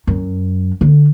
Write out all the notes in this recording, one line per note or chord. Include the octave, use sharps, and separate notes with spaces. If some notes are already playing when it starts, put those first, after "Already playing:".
F#2
D3